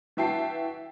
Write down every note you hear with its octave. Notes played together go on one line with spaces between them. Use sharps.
E3 F#4 E5 G5 A5 C7